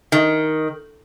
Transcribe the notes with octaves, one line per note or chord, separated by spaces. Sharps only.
D#3